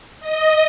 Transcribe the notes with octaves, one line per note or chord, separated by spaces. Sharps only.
D#5